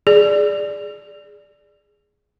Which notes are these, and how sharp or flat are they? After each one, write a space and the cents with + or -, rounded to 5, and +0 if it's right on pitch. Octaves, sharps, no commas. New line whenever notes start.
G#4 +0 D5 +0